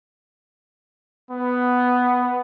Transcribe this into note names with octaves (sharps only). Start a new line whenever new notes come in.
B3